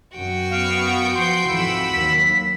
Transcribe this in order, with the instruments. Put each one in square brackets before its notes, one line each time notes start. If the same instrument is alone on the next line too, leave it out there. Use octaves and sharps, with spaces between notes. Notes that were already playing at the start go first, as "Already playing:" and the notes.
[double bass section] F#2 [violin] F#4 G5
[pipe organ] B3 C#6 [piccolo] F5
[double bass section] F3 [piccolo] C6 [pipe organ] G6
[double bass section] F2 G#2 E3 [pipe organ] B5 E6
[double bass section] D#2 F#3 A#3 [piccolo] B6